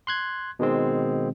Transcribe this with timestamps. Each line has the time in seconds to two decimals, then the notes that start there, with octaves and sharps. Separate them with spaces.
0.07 C6 F#6 G#6
0.59 B2 D#3 G#3 C4